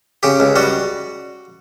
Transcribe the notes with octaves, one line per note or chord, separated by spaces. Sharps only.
C#3 G4
C#2
G3 F#4